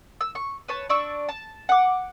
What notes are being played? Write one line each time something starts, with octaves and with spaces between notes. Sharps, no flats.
E6
C#6
B4 C#5 A5
D4 D5 C#6 E6
A5
F#5 D6